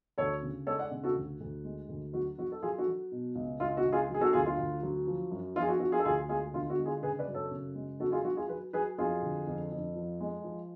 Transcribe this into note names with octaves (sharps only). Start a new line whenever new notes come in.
D2 A4 C#5
C#3
G#3 A4 C#5
D5 F#5
C#3
F#4 A4
D2
D2
G#3
D2
F#3 F#4
F#3 F#4
A4
F#3 F4 G#4
F#4 A4
F#3
B2
C#2
C#2 F4
F#4
C#2
F4 G#4
F#3
G#4
F#4 A4
D2 F4 G#4
F4
D2
F#3
F3
F#2
F3 F4
G#4
F#4
F3 F#4
F4 G#4
A4
D2 F4 G#4
G#3 F4 G#4
D3 F4
F#4
G#3
F4 G#4
C#3 G#4 B4
B4 D5
F#2
A4 C#5
C#3
G#3
F#3 F#4 A4
F4 G#4
F#3 F#4
F4 G#4
F#3 G#4 B4
F#3 G#4 B4
F2 F4 G#4
D3
F2
F2
F3
G#3
F3